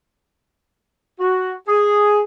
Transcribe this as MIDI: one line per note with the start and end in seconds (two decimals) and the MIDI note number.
1.20 1.55 66
1.68 2.20 68